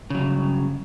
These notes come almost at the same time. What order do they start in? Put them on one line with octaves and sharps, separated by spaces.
C#3 F#3 G2